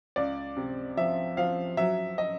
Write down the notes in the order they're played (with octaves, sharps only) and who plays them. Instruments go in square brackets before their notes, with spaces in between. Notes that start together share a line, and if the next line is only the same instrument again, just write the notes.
[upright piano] C#2 D5
C3
F3 E5
F3 F5
F#3 E5
D#5